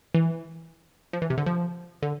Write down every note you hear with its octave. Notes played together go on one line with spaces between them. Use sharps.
E3
F3
E3
C3
D3
F3
D3